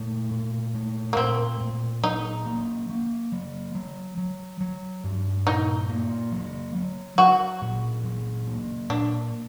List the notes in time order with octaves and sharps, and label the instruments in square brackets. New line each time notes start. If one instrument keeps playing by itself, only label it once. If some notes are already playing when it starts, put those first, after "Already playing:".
Already playing: [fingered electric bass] A#2 A3
A#2
A3
[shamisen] A#3
[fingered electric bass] A#2 [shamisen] C4
[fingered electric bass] A#2
[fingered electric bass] F#3 [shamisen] D#4
[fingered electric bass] A#3
A#3
F#3
F#3
F#3
F#3
G2
[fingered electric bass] A#2 [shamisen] D#4
[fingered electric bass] A#3
F#3
F#3
[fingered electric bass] F#3 [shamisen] F#4
[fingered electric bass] A#2
F#3
A#3
[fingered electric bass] A#2 [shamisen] D4